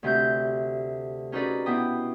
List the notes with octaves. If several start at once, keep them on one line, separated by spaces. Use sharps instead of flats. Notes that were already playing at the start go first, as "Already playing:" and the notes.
D2 C3 A3 G6
C#4 D#4 F#4 G#4 B4 D5
B2 B3 E4 G5 D#6